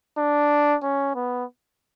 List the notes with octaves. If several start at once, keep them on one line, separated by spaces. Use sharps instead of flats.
D4
C#4
B3